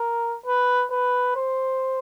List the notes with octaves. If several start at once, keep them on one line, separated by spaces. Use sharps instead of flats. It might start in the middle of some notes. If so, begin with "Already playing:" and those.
Already playing: A#4
B4
B4
C5